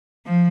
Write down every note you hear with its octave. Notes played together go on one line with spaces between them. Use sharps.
F3